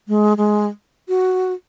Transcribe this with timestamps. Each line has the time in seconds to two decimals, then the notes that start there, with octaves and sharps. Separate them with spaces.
0.08 G#3
0.37 G#3
1.08 F#4